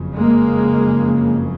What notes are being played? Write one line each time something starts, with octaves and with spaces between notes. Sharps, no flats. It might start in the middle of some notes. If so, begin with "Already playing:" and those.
Already playing: F#1 F2 C#3
G#3 A#3